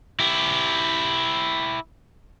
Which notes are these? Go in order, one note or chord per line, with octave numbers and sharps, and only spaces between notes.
E4 G4